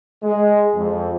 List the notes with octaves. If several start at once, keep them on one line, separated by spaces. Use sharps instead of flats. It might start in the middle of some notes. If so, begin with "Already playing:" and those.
G#3
F2